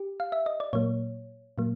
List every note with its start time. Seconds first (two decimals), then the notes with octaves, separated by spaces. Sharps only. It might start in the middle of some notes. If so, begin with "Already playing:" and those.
Already playing: G4
0.20 F5
0.32 E5
0.46 D#5
0.60 D5
0.73 A#2 F#3 A#3 C#5
1.58 A#2 F#3 A#3